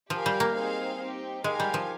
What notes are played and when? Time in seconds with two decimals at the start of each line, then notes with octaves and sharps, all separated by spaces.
0.10 F3 G4 A#4 F5 G#5
0.26 G3
0.40 A#3
0.55 C4 D#4 G#4 C5 F5
1.00 C4 D#4 G4
1.44 G#3 D#4 G4 A#4 F5 G#5
1.60 G3
1.74 F3